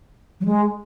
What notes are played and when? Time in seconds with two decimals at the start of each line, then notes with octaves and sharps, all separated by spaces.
0.40 F#3
0.45 G#3